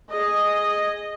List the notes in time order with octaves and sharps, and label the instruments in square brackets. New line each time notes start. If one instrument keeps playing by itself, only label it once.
[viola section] G#4 D#5